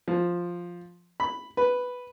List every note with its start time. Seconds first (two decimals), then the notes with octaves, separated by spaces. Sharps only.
0.08 F3
1.20 B5
1.57 B4